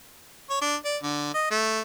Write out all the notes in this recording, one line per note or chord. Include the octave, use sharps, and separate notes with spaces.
C#5
D4
D5
D3
D#5
A3